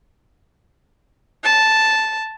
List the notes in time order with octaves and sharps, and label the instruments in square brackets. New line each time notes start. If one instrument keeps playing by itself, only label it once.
[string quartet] A5